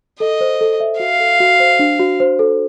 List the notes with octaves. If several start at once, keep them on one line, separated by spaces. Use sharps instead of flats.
A4 D#5
C5
A4
E5
F#4 F5
A4
F#4
C5
D4
F#4
C5
A4